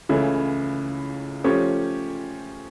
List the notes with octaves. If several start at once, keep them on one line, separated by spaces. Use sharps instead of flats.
C#2 C#3 E3 A3 E4
F3 A3 C#4 G4 C#5